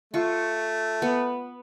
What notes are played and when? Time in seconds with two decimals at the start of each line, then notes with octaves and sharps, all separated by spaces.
0.14 A3 F4 C#6
1.02 B3